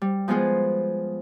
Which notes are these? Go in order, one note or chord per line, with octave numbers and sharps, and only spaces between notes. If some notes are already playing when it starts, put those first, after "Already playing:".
G3
F3 G#3 B3 F4 G#4